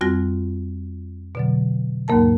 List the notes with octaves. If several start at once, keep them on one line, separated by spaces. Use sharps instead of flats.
F2 G3 C4 F4 F#4 A#6
B2 D3 F#3
D#2 G#2 F#3 A#3 A#4 A5